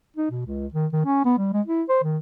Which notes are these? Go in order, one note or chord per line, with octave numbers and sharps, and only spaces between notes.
D#4
B2
C#2
D#3
D#3
C#4
B3
G3
G#3
E4
C5
D#3